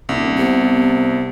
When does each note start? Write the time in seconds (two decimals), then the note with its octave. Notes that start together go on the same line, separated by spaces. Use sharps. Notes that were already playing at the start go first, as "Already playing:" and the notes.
0.09 D#1 C2
0.38 C3 B3